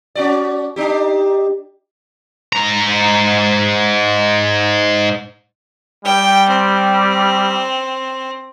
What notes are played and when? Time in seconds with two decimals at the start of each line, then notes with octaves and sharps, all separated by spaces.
0.15 C#4 F#4 D5
0.76 D4 D#4 G4
2.53 G#2 A#5
6.05 G3 G5
6.49 C4